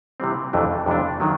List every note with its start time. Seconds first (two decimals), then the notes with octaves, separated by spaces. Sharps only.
0.20 C3 E3 G3 C4
0.53 F2 C3 E3 A3 D4
0.86 F2 C3 E3 A3 D4
1.20 D#3 F#3